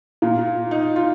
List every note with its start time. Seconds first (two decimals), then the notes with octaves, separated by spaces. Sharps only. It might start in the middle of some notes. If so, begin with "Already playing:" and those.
0.22 A#2 F4
0.71 D#4
0.96 F4